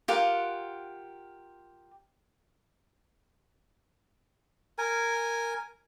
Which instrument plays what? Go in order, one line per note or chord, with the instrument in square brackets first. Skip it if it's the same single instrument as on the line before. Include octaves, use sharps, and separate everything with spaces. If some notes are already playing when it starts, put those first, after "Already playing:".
[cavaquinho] F4 G4 A#4 F#5
[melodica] A#4 G#5